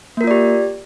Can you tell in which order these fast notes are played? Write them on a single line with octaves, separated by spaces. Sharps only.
A#3 A#4 F4 D5 G4